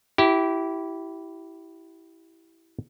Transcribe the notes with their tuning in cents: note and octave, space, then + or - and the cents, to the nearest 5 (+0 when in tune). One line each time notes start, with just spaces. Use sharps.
E4 +0 G4 -25